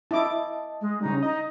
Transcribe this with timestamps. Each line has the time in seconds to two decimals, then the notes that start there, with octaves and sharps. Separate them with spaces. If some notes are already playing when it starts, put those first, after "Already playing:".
0.11 E4 D#5 A5 D6
0.81 G#3
1.01 C#3 G3 D#4
1.23 D#4 D#5